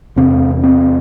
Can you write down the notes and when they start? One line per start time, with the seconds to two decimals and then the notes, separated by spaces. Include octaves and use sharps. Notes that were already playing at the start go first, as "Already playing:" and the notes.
0.16 E2 C3 C4
0.64 C4